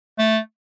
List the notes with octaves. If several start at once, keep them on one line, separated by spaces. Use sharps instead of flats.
A3